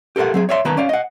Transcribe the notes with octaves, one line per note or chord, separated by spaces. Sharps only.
G4 A4 A#4 C5 F#5
F#3 C4 G#4
C#5 D5 E5 F5 C6
D#3 B3 B4 A5 A#5
C#4 D5 F5
D#5 F#5